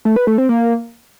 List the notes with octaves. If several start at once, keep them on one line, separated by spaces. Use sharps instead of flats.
A3
B4
A3
C4
A#3